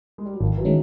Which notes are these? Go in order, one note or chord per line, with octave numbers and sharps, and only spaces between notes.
G#3
G3
F#3
G#1 D#3 F3
E3 F#3
D#3 G#3 C#4